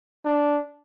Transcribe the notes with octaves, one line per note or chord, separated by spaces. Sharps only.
D4